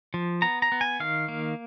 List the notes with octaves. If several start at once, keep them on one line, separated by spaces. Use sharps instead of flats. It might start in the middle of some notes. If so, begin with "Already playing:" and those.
F3
B3 A#5
A#5
B3
G#5
D#3 F5
A#3